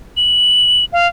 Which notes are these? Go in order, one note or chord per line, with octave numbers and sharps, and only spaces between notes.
F#7
F5